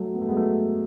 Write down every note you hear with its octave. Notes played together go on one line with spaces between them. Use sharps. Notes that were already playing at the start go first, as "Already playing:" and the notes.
Already playing: F#3 A3
B3
A3
G#3 B3
F#3 A3